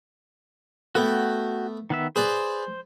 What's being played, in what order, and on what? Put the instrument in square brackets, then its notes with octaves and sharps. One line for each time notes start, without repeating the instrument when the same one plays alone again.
[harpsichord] A3 B3 [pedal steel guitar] F#4 G5
[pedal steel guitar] D#3 B3 E5
[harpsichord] G#4 B4 D5 [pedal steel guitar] C5